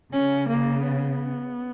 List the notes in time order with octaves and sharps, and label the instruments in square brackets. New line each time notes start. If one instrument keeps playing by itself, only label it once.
[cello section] C#3 [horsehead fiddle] C#4
[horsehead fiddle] A#3
B3